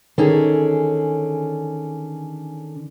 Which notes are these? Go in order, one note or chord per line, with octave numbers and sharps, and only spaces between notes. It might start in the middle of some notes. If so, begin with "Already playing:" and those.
D3 D#3 C#4 G#4